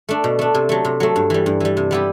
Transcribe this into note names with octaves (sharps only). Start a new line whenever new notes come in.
A3 D4
B2
A3 D4
C3
F#3 A3
C3
F#3 A3
G2
E3 G3
G2
E3 G3
C3
G3 B3 E4 G4